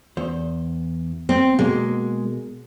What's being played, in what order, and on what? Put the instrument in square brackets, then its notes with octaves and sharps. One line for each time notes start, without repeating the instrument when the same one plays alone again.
[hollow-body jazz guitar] E2 C5
[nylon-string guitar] C4
[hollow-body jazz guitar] B2 A#3 [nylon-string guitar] G#3